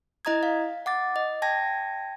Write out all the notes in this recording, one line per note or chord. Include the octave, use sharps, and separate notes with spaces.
E4 D#5 A#5 D#6 G#6
F5
F#5 D6 A6
D#5
G5 A5 G#6 A#6